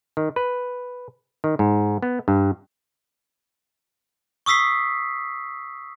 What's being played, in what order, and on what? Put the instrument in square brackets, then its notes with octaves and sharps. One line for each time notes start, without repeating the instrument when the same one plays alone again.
[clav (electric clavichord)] D#3
B4
D#3
G#2
B3
G2
[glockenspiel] C#6 D#6 E6 B6 C7